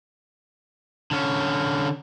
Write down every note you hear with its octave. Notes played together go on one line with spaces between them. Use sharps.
D3 C#4